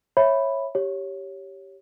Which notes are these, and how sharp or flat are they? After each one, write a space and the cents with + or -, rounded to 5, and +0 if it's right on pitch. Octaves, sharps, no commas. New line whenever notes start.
C#5 -20 E5 +0 B5 +0
G4 -5 C#5 +0